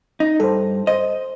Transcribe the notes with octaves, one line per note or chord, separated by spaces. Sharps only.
D#4
G2 A4 C5
C5 D#5